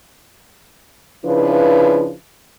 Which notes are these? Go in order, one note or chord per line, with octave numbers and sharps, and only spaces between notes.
C#3 F3 D4 E4 B4